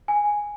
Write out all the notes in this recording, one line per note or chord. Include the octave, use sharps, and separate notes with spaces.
G#5